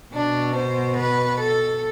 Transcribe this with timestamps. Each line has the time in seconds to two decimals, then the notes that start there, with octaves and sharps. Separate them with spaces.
0.13 B2 D4
0.56 C5
0.97 B4
1.39 A4